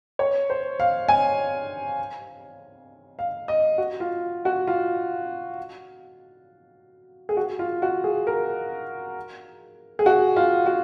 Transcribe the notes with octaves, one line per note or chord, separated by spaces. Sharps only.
C#5
C5
F5
G#5
F5
D#5
F#4
F4
F#4
F4
G#4
F#4
F4
F#4
G#4
A#4
G#4
F#4
F4
F#4